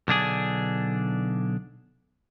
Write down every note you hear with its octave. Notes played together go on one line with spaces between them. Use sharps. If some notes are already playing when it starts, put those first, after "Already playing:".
B1 D3 D4 G#4